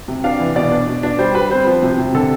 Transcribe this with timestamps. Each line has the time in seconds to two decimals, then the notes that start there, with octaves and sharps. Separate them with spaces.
0.08 C3
0.24 D4 F5
0.40 E3
0.55 B2 D5
0.72 D4
0.88 B2
1.03 D4
1.19 G3 C5
1.35 G3 B4
1.51 C4 C5
1.67 F3
1.83 C3
1.98 C3
2.15 D3 A4